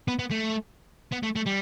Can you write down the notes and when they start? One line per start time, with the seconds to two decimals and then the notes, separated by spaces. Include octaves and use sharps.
0.08 B3
0.19 B3
0.31 A3
1.12 B3
1.23 A3
1.36 A3
1.46 G3